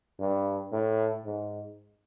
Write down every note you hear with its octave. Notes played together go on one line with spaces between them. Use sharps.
G2
A2
G#2